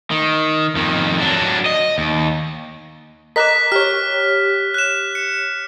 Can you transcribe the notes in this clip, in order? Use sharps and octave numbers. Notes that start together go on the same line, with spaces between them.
D#3
F2 D#3
F#3 D4
D#5
D#2
A#4 D#5 A#5 D6 F#6 B6
G4 C#5 F6
F#6 E7
C#7